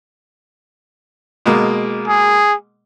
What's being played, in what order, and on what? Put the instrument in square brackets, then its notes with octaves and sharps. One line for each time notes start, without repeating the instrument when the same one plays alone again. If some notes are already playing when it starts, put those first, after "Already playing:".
[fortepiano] B2 G#3 A#3
[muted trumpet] G#4